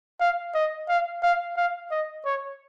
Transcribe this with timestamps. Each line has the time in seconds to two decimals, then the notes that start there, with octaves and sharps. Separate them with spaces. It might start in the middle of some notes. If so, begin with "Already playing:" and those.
0.20 F5
0.55 D#5
0.89 F5
1.23 F5
1.57 F5
1.91 D#5
2.25 C#5